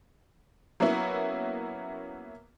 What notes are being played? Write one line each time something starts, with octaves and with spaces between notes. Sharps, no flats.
F#3 A#3 B3 C#4 E4